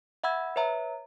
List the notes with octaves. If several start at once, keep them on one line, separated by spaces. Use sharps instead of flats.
E5 F#5 B5 E6 G#6
B4 C#5 E5 A#5